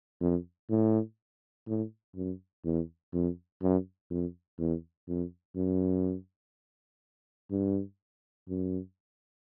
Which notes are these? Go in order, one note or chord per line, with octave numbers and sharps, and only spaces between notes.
F2
A2
A2
F#2
E2
F2
F#2
F2
E2
F2
F#2
G2
F#2